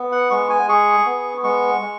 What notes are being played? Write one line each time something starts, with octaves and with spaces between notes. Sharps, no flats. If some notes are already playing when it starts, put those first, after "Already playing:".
Already playing: B3
F#5
G#3 C#6
G#5
G#4 C#6
B3
G#3 C#6
G#3